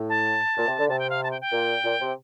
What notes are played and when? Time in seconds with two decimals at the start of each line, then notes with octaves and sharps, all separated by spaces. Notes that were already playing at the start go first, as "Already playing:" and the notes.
Already playing: A2
0.09 A5
0.57 A#2
0.67 C3
0.79 D3
0.89 C3 A5
0.99 G5
1.10 F5
1.24 A5
1.31 G5
1.41 G5
1.52 A#2
1.84 A#2
2.01 C3